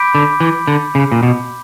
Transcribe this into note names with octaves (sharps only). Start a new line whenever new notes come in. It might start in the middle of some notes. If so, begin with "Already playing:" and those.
Already playing: B5 D6 G6 B6 D7
D3
E3
D3
C#3
A#2
B2